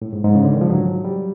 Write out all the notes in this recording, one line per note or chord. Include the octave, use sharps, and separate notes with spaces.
A2
G#2
G#2
C#3
D3
D#3
F3
F#3
G3